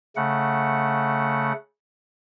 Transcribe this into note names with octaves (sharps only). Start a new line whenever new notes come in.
C#3 A3 F#5